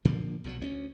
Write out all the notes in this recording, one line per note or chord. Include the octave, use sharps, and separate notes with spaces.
A#2 D3 F3 A#3
B1 B2 F3 F#3
D2 B3 C#4